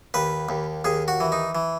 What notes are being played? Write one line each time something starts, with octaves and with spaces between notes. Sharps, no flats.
D#2 B4
D#2
D#2 G#4
F#4
E3
D#4
E3